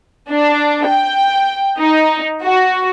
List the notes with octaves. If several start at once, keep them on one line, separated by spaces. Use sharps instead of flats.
D4
G5
D#4
F#4